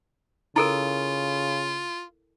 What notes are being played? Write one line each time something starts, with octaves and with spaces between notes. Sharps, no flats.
C#3 E4 F4 A4 A#4